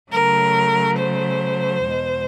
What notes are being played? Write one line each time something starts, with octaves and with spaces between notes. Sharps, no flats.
C#3 F#3 A3 A#4
C5
E2 B2 G#3